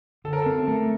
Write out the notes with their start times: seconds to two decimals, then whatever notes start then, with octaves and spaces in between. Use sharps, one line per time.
0.24 D3 A4
0.33 A#4
0.42 C4 A4
0.68 A3